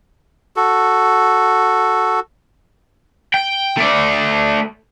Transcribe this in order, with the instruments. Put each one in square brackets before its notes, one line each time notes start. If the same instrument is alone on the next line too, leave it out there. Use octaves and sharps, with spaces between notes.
[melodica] F#4 A4
[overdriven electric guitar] G5
A3 D5